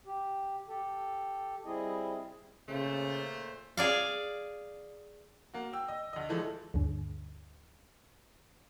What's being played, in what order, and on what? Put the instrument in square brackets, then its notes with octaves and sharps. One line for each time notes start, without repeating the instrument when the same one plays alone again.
[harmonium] G4
G4 A4
G3 C4 E4 G#4 D#5
[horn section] A#2 A3 C5 [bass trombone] C#3
[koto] G#4 D5 F5
[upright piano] A#3 F#4
G5 E6
D#5
D2 D#5
E3 F3 G#3 A3 A4
[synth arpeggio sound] D2 G2 D3